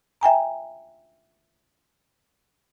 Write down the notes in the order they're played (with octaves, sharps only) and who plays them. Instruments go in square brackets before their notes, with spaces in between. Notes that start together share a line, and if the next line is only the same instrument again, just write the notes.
[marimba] E5 G5 G#5 A#5